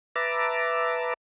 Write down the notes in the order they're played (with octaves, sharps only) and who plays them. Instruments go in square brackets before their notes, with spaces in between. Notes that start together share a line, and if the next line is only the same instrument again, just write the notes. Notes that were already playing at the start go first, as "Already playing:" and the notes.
[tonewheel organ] B4 E5 A5 A#5 D6